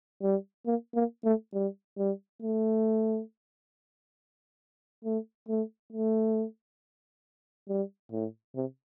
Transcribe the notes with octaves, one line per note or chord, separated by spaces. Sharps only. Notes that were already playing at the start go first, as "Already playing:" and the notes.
G3
A#3
A#3
A3
G3
G3
A3
A3
A3
A3
G3
A2
C3